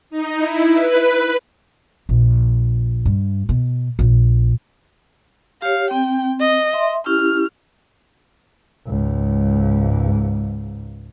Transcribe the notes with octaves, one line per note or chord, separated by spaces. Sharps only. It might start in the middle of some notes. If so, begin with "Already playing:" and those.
D#4
E4
B4
A#1
G2
B2
A#1
G4 C#5 F5
C4 G5
D#5
E5 C6
C#4 E4 G4 F6
C#2 G#2